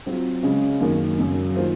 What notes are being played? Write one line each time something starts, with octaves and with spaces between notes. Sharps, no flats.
F#3 C4 F4
C#3 G#3 C#4
F#2 D#3 A#3
F#2 C#3 F#3
D#3 A#3 F4 C5